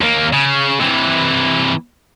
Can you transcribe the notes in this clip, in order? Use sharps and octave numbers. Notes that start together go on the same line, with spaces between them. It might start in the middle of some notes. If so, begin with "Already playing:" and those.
D#2 A#3
C#3
C3 E3